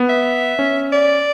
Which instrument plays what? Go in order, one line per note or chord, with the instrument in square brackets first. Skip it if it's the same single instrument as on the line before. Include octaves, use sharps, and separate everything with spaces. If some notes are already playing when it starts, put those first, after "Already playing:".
Already playing: [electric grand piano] B3
[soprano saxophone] E5
[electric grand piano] C#4
[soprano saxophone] D5